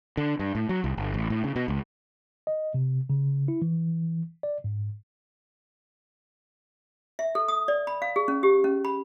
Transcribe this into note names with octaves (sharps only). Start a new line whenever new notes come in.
D3
G2
A2
F#3
C2
G1
A1
A2
C#3
B2
C#2
D#5
C3
C#3
E4
E3
D5
G#2
E5
A4
D#6
D5
B5
F5
G#4
C#4
G4
C#4
B5